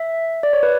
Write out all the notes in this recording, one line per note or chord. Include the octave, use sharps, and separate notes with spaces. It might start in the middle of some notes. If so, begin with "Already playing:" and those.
Already playing: E5
D5
C#5
B4